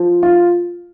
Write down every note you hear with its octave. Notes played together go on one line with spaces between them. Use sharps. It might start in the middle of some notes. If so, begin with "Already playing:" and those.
Already playing: F3
F4